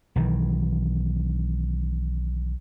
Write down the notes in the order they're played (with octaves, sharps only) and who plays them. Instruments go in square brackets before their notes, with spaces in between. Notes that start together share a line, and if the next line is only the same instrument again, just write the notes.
[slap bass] B1 D#3 E3